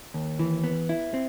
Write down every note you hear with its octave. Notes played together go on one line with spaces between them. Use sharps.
D#2
E3
B3
E4
C4